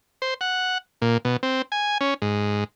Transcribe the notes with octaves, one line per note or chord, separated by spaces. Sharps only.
C5
F#5
A#2
B2
C4
G#5
C#4
G#2